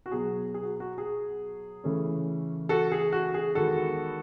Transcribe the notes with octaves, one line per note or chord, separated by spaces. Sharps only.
F#4
B2 F#3 B3 G#4
G#4
F#4
F#4
G#4
C#3 E3 A3 C#4
F#4 A4
G#4
F#4
G#4
E2 D#3 G#3 B3 F#4 A4